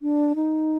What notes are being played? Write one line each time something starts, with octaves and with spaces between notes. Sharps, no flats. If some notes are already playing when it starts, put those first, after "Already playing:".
D4
D#4